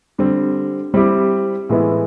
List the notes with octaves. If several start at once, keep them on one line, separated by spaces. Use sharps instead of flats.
D3 G3 C4
G3 C4 E4 G4
A2 E3 G#3 B3 E4